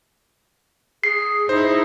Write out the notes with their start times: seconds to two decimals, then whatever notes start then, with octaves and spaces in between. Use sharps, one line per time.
1.04 G#4 C7
1.49 D#4 E4 C5